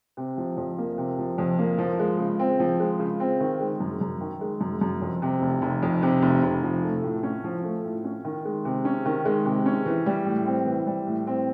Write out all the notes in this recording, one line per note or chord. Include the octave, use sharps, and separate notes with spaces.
C3
F3
F2
A#3
C3
F3
F2
A#3
F3
G#3
C#3
C4
F3
G#3
C#3
C4
D#3
G#3
F#2
F#2
D#3
G#3
F#2
F#2
F2
C3
F1
F1
F2
C3
F1
F1
F3
A3
A2
C#4
F3
A3
A2
C#4
D#3
G#3
C3
C#4
D#3
G#3
C3
C#4
E3
G3
A2
C4
E3
G3
A2
C4